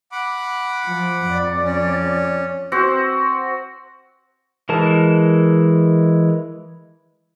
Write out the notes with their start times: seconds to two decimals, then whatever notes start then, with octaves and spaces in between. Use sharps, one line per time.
0.12 F#5 B5 D6
0.87 F3
1.26 F2 D5
1.64 C#4
2.72 C4 F#4
4.69 E3 G#3 A#4 A5